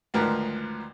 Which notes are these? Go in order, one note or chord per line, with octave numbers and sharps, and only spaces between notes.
G#1 D2 F3 A#4 B4